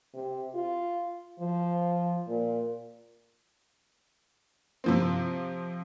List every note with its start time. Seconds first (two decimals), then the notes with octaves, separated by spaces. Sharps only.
0.14 C3
0.54 F4
1.40 F3
2.27 A#2
4.84 C3 F3 C4